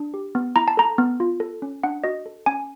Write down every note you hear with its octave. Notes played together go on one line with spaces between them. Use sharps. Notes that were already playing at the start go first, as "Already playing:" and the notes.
Already playing: D4
G4
B3
E4 A#5
A5
A4 A#5
B3
F4
A4
C#4
D4 F#5
F#4 D#5
A4
C#4 G#5